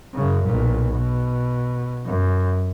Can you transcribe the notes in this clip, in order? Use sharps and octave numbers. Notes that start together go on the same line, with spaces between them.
F#2 C#3
B1 A#2
B2
F#2